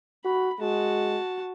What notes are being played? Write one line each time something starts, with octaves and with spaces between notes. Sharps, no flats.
F#4 B5
G#3 F#4 A5